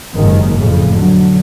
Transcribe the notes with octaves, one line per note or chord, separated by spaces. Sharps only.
F#1 D#2 G#2 D#3
F2 A2 C#3
D3 F#3